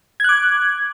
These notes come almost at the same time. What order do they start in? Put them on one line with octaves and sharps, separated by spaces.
G#6 F#6 D6